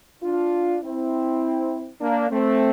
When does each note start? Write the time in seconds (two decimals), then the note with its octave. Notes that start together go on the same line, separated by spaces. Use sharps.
0.22 D4 F4
0.82 C4 E4
2.01 A#3 D4
2.30 A3 C4